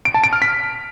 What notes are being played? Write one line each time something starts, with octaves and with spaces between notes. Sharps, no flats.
D7
A5
D7
F6
B6